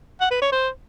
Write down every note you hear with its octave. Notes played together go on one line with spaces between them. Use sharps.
F#5
B4
C#5
C5